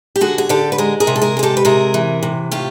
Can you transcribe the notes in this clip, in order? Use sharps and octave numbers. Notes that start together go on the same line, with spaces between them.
G4
D3 F#4 G#4
G#4
D3 G4 A4
B4
G#3 G#4 A#4
G#4 A#4
C3
A4
G#4 A#4
G#3 G#4
G4 A4
B4
C3 G#4 A#4
E3
C3
A2 F4 G4